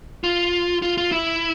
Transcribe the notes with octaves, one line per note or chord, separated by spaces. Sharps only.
F4
F4
F4
E4